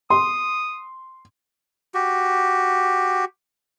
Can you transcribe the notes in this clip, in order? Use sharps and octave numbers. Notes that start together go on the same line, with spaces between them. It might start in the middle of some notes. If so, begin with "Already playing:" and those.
C6 D#6
F#4 G4